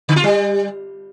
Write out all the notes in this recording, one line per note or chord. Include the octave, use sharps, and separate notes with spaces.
D3
F4
G3